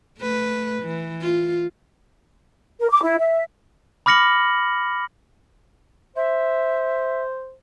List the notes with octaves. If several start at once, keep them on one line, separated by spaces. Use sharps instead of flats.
A3 B4
E3
F4
A#4
D6
E4
E5
B5 D6 F6 A#6 C#7 F#7
C5 E5